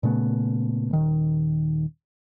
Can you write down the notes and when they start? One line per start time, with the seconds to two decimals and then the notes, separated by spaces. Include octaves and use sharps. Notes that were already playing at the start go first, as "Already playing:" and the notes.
0.03 A#2 C#3 A3 B3
0.91 D#1 D#3